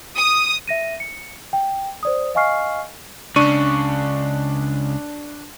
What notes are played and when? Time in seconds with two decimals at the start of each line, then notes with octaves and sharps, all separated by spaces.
0.16 D#6
0.68 E5 A#6 D#7
1.00 C#7
1.53 G5
2.03 C5 D5 D#6
2.35 D#5 F5 G#5 C#6 F6 C7
3.36 C#2 C#3 D4 C#6 D#7